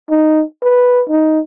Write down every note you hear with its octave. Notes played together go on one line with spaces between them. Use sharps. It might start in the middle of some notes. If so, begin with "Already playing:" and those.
D#4
B4
D#4